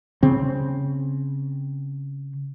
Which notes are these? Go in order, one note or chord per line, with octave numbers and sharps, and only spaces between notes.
C#3 C4